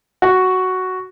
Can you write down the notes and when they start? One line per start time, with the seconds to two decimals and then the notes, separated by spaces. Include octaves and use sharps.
0.22 F#4